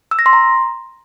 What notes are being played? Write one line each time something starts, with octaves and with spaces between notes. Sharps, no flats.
E6
A#6
C6
A#5